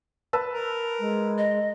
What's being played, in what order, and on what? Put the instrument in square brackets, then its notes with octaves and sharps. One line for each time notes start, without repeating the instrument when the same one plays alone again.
[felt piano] B4 A5 E6
[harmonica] A#4
[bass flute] G#3
[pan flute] D#5